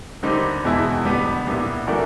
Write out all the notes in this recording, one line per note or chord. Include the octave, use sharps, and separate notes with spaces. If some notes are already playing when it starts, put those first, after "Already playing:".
D#2 D3 G3 C4 D#4
E2 B2 G#3 B3 E4
F2 D3 G3 B3
C2 A#2 G3 B3 E4
E3 A3 D4 F#4 A#4